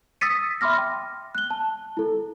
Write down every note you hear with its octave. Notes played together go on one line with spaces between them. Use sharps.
D#6 E6 A6 B6 C#7 D#7
E5 B5 C6 D6 F6 A#6
G5
F#6 G7
A5
E4 A4